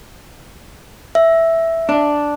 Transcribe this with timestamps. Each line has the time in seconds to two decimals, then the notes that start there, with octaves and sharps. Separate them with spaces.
1.15 E5
1.89 D4